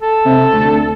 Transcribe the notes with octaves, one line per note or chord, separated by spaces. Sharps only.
A4
C3
D2